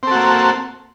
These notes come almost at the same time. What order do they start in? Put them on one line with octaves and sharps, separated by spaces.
C4 A4 F#4 A#3